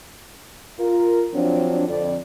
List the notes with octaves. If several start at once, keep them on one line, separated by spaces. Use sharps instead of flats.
F4 A#4
F3 F#3 C4 D4
F2 D3 D5